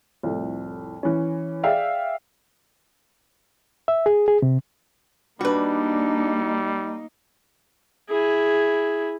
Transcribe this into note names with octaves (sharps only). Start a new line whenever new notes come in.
C2 F2 A2
E3 C#4
G#4 D5 E5 F5 G5
E5
G#4
G#4
C3
G3 A#3 D4 D#4 F#4 B4
E4 G#4